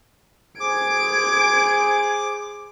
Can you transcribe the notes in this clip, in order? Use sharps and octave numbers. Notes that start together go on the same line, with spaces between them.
G#4 C5 D6 G#6 D7